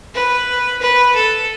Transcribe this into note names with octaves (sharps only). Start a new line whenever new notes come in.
B4
B4
A4